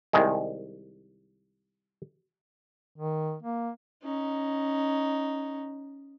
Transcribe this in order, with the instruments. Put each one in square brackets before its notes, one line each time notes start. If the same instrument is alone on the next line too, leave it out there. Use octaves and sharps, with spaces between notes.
[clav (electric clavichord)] C2 D#3 G#3
[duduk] D#3
A#3
[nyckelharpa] C#4 D#4